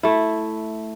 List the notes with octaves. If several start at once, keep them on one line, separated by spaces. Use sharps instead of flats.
A3 E4